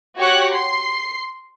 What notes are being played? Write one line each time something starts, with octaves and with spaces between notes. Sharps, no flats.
F#4 G4 C#5 F#5 C#6 F#6
C6 C7